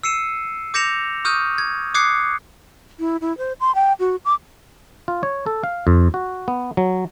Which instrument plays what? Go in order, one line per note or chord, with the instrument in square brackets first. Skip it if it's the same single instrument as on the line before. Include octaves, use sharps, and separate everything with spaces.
[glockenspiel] E6 C7 C#7 D#7 E7
D6 G6 A#6 C#7 E7 F7
C#6 D#6 F6 G6 D#7
G#6
D6 D#6 F#6 G#6 C7 C#7
[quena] E4
E4
C5
C6
G5
F#4
D6
[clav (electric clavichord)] F4
C#5
A4
F5
F2
F#4
B3
F#3